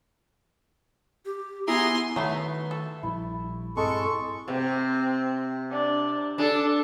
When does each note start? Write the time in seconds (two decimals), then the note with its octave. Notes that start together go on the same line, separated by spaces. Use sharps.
1.25 G4
1.68 B3 E4 G#4 G#5 A#5 C6
2.16 D#3 F#3 A3 B3 C#6
2.71 A4
3.03 A#1 F3 G3 E4
3.77 G2 G#3 C4 A4 C#6
4.48 C3 C4
5.71 D4
6.38 D4 A4